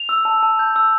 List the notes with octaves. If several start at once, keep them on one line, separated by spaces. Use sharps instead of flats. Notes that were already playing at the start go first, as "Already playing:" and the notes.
Already playing: F7
E6
A5
A5
G6
E6